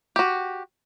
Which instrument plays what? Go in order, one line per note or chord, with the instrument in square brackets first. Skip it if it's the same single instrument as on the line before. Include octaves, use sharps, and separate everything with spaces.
[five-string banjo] F#4 G4